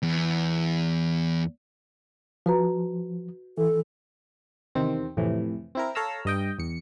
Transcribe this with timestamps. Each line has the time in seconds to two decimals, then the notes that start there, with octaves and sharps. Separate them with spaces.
0.03 E2
2.46 F3 F#4 B4 A#5
3.58 E3 A4
4.75 E2 C3 D#3 C4
5.17 F2 A2 C3 E3
5.75 C4 E4 A#4
5.95 A4 C#5 F5 A#5 E6
6.25 G2 D#5 G5
6.59 E2 C#7